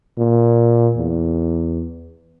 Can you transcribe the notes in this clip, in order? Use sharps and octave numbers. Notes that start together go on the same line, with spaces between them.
A#2
E2